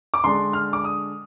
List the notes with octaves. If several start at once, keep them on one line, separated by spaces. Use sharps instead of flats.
D6
D3 G#3 D4 C6
F6
D6
D#6